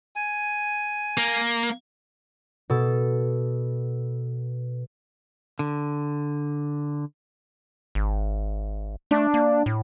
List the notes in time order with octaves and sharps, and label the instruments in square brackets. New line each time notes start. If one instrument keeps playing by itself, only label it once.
[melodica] G#5
[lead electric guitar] A#3
[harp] B2 A4
[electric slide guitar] D3
[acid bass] G#1
[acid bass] A3 [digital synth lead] D4
[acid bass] A#3
A2